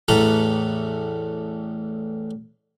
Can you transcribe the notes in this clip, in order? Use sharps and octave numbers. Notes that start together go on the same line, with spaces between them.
A1 E2 A2 A4 B4 A#5